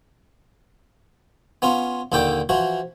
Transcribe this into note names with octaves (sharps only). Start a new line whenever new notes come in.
B3 C#4 F4
D#2 A#2 D3 A4 G5 D6
E3 F3 F#4